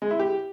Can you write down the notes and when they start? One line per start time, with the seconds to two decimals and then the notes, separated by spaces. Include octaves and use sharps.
0.02 G#3
0.11 E4
0.20 G4